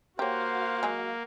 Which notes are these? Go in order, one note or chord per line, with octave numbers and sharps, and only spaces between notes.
A#3 F#4 G4 C5 C#5 F5 F#5
F#3 G#3 G#4